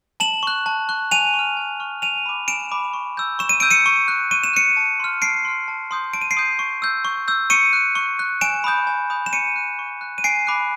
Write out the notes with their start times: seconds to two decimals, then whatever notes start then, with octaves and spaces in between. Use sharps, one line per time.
0.20 A5 E7 F#7
0.43 C#6 F#6
0.66 A5
0.89 C#6 F#6
1.11 G#5 D#7 F7
1.34 C#6
1.39 F6
1.57 G#5
1.80 C#6 F6
2.02 G#5 D#7 F7
2.26 B5 D6
2.48 G#5 D7 E7
2.72 B5 D6
2.94 C#6
3.17 E6 G6
3.39 C#6 E7
3.49 D#7
3.60 E6 G6 D7
3.71 C#7 D#7
3.86 C#6
4.08 F#6
4.31 C#6 D#7
4.44 E7
4.53 F#6 C#7 D#7
4.77 A5
5.00 C6 F6
5.22 A5 C7 D7
5.45 C6 F6
5.68 A5
5.91 C6 D#6 G6
6.13 A5 D7
6.21 D#7
6.31 C7 D7
6.37 C6 D#6 G6
6.59 C#6
6.82 E6 G6
7.05 C#6
7.28 E6 G6
7.50 C#6 C#7 D#7
7.73 F#6
7.95 C#6
8.19 F#6
8.41 G#5 D7 E7
8.64 B5 D#6 G6
8.87 G#5
9.10 B5 D#6 G6
9.26 E7
9.33 C#6 C#7 D#7
9.56 F#6
9.79 C#6
10.01 F#6
10.18 D#7
10.24 G#5 C7 D7
10.47 B5 D6 F#6